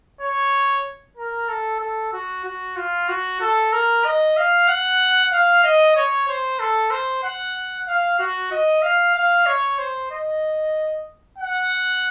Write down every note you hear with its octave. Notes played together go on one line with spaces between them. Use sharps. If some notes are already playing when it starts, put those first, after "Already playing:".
C#5
A#4
A4
A4
F#4
F#4
F4
F#4
A4
A#4
D#5
F5
F#5
F5
D#5
C#5
C5
A4
C5
F#5
F5
F#4
D#5
F5
F5
C#5
C5
D#5
F#5